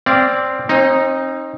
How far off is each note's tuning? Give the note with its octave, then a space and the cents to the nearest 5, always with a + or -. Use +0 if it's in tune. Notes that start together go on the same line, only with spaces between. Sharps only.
C4 +0 D5 -15 F5 -25
C4 +40 D#4 +0